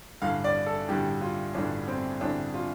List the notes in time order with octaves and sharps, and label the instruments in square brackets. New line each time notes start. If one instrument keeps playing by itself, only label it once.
[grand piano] A1 G2 D3 F5
D5
A4
A1 G2 D3 G4
F4
A1 G2 D3 D4
C4
A1 G2 D3 D4
F4